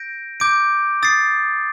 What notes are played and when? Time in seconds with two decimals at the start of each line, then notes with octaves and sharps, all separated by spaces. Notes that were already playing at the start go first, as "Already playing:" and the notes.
Already playing: G6 A#6 D7
0.40 D6 G6 D7
1.03 D#6 A6 C7